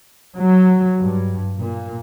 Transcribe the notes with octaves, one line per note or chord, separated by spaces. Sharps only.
F#3
G2
A#2